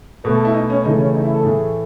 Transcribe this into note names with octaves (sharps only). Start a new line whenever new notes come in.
B2 A3 B4
A4
E4
D#4
C#4
C#3 E3 A3 D#4
C#4
D#4
E4
A4
A2 E3 A3 G#4